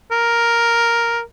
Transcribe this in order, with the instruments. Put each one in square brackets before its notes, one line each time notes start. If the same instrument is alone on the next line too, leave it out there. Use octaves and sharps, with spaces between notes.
[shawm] A#4